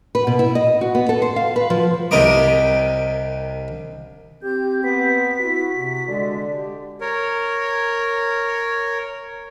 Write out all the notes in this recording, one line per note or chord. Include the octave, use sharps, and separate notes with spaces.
B4
B2
E4
D#5
F#4
B3
A4
C5
F5
B4
F3
C2 C3 A#4 D#5 D6
C4 G4 G6
B3 B6
E4 F#4
C3
D3 G#3 D5
G4
A#4 C#5